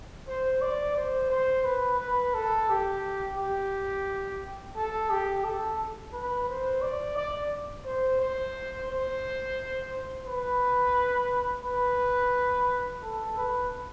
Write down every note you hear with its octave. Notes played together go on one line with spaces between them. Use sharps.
C5
D5
C5
C5
B4
B4
A4
G4
G4
A4
G4
A4
B4
C5
D5
D5
C5
C5
C5
B4
B4
A4
B4